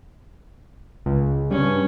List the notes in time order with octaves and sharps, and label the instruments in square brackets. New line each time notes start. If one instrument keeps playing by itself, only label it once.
[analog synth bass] C#2
[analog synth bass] G2 [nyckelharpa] C#4